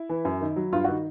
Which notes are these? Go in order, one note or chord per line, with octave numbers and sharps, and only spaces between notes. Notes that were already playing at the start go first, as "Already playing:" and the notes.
Already playing: E4
E3
F#2
D#3
F#3
G2 F4
D#3 F#4